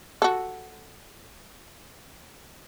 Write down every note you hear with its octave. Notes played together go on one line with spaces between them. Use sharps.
F#4 A4